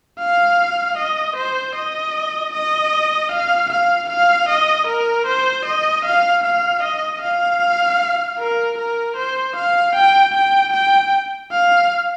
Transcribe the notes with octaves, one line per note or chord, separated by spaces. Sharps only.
F5
D#5
C5
D#5
D#5
F5
F5
F5
D#5
A#4
C5
D#5
F5
F5
D#5
F5
A#4
A#4
C5
F5
G5
G5
G5
F5